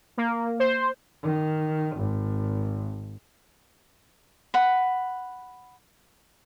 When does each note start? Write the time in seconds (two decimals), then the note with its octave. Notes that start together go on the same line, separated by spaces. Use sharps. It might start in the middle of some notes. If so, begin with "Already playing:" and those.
0.17 A#3
0.60 C5
1.23 D#3
1.96 G#1
4.54 F#5 B5